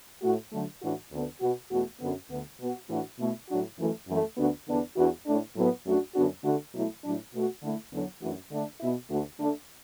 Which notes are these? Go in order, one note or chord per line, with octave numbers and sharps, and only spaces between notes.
A2 A3 F#4
D3 F#3 A3
A2 E3 D4 F#4
D2 D3 B3
B2 B3 F#4
E2 B2 A3 F#4
F#2 D3 B3
D2 D3 B3
B2 B3 F#4
A2 E3 A3 D4 F#4
B2 A3 E4
A2 F#3 D4 F#4
F#2 E3 A3
F#2 E3 A3
D2 D3 B3 D4 F#4
E2 D3 B3 D4
E2 E3 D4 F#4
A2 A3 D4
A2 F#3 B3
F#2 F#3 A3 D4 F#4
F#2 D3 B3 D4 F#4
D3 A3 F#4
B2 F#3 A3 E4
A2 F#3 D4
B2 A3 F#4
D3 A3 E4
E2 D3 F#3
F#2 E3 A3 D4 F#4
D3 A3 D4
B2 B3 E4
D2 D3 A3 F#4
D3 A3 D4